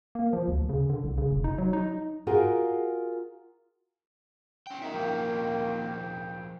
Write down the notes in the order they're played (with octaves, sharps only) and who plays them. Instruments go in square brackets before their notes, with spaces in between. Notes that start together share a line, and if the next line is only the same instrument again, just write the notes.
[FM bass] A#3
F3
D2
C#3
D3
C2
C#3
F1
D#4
F#3
D#4
[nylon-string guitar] F4 F#4 G#4 A#4 G5
[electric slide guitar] C#4 G5
[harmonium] D#3 A#3 [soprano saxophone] D#4 [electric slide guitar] F#4 E5
[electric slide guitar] F3 C#4 A#4 [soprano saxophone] G5